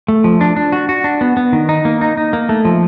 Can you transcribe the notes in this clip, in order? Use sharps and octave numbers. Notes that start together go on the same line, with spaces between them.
A3
F3
D4
D4
F#4
F#4
D4
B3
B3
D#3
D#4
A#3
D#4
D#4
A#3
A3
F3